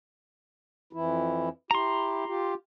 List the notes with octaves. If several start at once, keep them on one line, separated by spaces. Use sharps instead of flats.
F2 E3 E4
E4 G4 A#5 C6
F4 G4